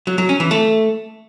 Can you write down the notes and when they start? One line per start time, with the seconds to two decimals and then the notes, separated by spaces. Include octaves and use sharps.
0.07 F#3
0.18 F#3
0.29 C#4
0.40 E3
0.51 A3